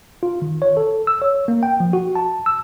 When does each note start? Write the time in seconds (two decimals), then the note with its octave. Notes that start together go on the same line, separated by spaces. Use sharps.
0.23 F4
0.42 D#3
0.62 C#5
0.77 A4
1.07 E6
1.22 C#5
1.48 A#3
1.63 G5
1.80 F3
1.93 F#4
2.15 A5
2.46 E6